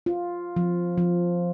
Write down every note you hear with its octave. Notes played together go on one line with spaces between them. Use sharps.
F4
F3
F3